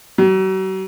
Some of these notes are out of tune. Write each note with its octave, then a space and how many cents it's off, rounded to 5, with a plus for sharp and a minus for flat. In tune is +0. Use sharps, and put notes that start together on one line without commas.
F#3 +40